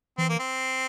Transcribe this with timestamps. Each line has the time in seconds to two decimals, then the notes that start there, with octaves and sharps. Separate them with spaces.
0.18 E3 C4
0.29 A#3
0.39 C4